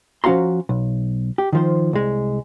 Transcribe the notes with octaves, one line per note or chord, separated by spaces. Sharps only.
F3 C#4 F#4 F5 A#5 C6
B1
G4
D#3 F3 C5
C2 G#3